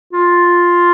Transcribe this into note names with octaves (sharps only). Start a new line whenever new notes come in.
F4